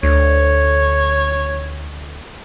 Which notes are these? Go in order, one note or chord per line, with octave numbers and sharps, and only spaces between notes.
D2 C#5